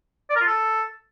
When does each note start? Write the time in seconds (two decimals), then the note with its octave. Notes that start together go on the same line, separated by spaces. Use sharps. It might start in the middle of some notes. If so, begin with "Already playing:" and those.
0.30 D5
0.36 A#4
0.41 F4
0.47 A4